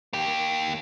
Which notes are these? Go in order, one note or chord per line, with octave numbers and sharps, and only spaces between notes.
A#3 G4